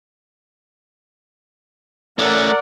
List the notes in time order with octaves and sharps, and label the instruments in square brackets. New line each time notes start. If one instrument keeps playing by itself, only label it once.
[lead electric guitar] A3 C#4 [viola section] A#4 D5 F#5